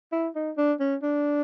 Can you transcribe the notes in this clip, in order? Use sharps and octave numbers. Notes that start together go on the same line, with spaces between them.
E4
D#4
D4
C#4
D4